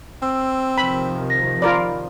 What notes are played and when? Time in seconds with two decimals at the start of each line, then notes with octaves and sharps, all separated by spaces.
0.22 C4 E6
0.78 C3 D#3 F3 B5
1.30 A#6
1.62 F4 A#4 D5 B5